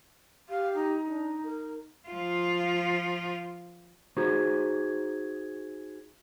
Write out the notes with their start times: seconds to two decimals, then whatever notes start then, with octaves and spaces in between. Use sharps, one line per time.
0.49 G4 F5
0.75 D#4
1.05 D4
1.44 A#4
2.09 F3 F4
4.17 D#4 F#4 G#4 C5